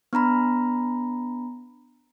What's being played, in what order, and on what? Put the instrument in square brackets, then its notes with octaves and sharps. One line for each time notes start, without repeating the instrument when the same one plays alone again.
[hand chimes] B3 D4 A#5 B5